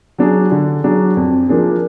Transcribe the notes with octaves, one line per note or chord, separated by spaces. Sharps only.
F#3 D4 G#4
D3
F#3 D4 G#4
F2
F3 A#3 D4 G#4